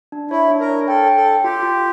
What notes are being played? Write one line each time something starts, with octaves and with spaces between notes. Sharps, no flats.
D4
E4 C#5
D4
A#4
C#5
A4 G5
G5
A4
G5
F4 G4
F4